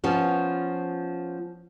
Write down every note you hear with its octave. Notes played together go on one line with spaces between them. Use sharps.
F3 B3 C#4